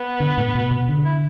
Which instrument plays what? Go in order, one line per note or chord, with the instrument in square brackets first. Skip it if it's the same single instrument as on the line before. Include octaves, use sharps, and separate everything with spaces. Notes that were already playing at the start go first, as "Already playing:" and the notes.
Already playing: [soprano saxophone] B3
[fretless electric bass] D3
A2
B2
B2
D3
[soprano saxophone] E4